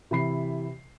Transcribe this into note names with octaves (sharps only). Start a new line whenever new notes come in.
C3 E3 B5 C7